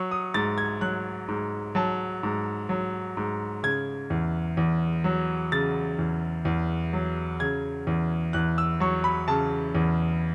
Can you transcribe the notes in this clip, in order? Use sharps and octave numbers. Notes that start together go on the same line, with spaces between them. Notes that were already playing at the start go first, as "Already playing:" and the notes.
Already playing: F#3 C#6
D#6
G#2 A6
G#6
F#3 F#6
G#2
F#3 A5
G#2
F#3
G#2
C#3 G#6
E2
E2
F#3
C#3 A6
E2
E2
F#3
C#3 G#6
E2
E2 F#6
E6
F#3 C#6
B5
C#3 A5
E2